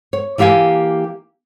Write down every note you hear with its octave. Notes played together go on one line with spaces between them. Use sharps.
C#5
E3 A#3 G4 F5 G#5